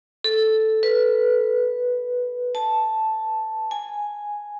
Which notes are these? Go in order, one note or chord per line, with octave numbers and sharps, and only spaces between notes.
A4
B4
A5
G#5